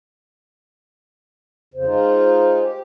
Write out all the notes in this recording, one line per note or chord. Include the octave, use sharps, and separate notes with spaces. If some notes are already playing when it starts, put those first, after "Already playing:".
F2 C#3 C5
G#3 D#4 F4
G4